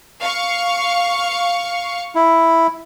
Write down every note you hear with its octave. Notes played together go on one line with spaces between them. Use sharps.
F5 C#6
E4